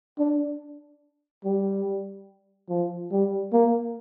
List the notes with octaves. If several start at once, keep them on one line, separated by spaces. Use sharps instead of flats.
D4
G3
F3
G3
A#3